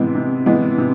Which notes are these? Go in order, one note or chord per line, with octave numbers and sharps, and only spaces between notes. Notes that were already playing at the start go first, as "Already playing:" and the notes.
Already playing: C3 E3 G#3 B3
C3
E3 G#3 B3
C3